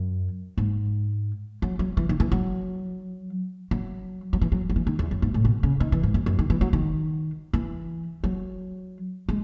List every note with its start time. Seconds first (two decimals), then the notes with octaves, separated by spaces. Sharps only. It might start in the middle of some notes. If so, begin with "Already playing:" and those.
Already playing: F#2
0.57 G#2
1.62 F#3
1.79 F#3
1.97 E3
2.09 D#3
2.20 E3
2.32 F#3
3.71 F#3
4.33 F#3
4.41 E3
4.52 F#3
4.70 F#3
4.76 E3
4.87 D#3
4.99 E2
5.11 F#2
5.22 G#2
5.34 A2
5.45 B2
5.63 C#3
5.80 D#3
5.92 E3
6.03 G#2
6.14 F#2
6.26 F#2
6.39 D#3
6.50 E3
6.61 F#3
6.73 D#3
7.53 E3
8.24 F#3
9.29 G#3